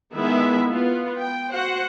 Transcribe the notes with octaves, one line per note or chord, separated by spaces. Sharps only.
D#3 G#3 B3 E4 E5
B3 F4
G5
F#4 C5 F#5